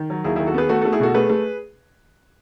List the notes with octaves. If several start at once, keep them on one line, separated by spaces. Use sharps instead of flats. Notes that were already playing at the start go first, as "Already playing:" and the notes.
Already playing: D#3
F#3
D#2 E4 G#4
D#3 E4 G#4
F#4 A4
B3 G#4 B4
A3 F#4 A4
A3 F#4 A4
E4 G#4
B2 F#4 A4
A3 G#4 B4
A3